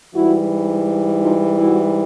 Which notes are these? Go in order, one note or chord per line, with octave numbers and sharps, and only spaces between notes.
G#2 E3 G3 E4 F#4
D#4 F4
E4 F#4